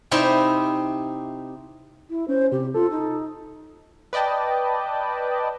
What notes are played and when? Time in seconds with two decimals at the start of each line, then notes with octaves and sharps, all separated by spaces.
0.11 C3 C4 D#4 E4 G4
2.10 E4
2.28 C#4 C5
2.52 C3 G4
2.74 F4 A4
2.91 D#4
4.13 B4 D5 D#5 G5 A5